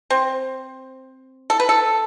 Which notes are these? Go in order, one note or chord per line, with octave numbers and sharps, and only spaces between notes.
C4
A4
B4
A4